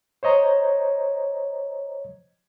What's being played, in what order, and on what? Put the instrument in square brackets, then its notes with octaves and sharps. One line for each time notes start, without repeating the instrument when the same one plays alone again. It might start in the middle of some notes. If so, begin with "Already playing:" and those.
[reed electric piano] C5 C#5 D#5 A#5